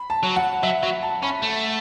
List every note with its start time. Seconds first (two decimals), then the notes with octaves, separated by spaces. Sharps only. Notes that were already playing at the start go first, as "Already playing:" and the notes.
Already playing: B5
0.10 A5
0.23 F#3
0.36 F#5
0.63 F#3 E5
0.82 F#3 F#5
1.03 A5
1.22 C#4 B5
1.42 A3